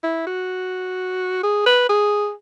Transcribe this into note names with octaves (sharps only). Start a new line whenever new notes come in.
E4
F#4
G#4
B4
G#4